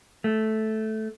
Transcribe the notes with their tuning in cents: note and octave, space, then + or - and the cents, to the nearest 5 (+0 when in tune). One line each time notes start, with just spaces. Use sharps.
A3 -10